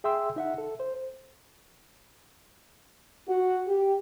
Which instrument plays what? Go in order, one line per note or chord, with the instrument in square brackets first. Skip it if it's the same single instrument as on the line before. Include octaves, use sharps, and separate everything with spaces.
[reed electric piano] G#4 E5 G5 C6 E6
D#4 E5 F#5
A4
C5
[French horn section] F#4
G4